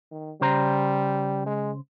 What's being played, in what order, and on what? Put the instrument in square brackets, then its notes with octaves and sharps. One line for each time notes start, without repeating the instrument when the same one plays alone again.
[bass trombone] D#3
[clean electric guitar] C#3 C5 A#5 [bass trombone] G3
[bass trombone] G#3